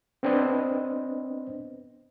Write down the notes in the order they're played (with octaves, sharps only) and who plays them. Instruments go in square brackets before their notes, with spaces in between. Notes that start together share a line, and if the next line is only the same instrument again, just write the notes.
[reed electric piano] B3 C4 D4 B4 C5 D#5